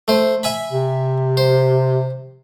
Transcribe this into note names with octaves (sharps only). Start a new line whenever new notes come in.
A3 C5
E5 G#5 B5
C3
C5